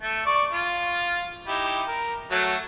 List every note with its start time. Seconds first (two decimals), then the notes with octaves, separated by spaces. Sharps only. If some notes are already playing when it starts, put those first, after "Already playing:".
0.02 A3
0.26 D5 C#6
0.53 F4
1.47 D#4 E4 G4
1.88 A#4
2.31 F#3 A3